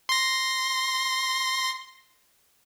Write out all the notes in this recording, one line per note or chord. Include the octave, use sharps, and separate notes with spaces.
C6 A#6